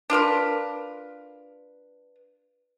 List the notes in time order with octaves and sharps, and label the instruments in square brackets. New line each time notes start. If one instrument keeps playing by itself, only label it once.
[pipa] D4 F4 A#4 B4